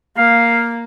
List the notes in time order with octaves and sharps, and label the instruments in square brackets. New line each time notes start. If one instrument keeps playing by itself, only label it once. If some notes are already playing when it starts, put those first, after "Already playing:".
[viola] A#3 [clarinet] F5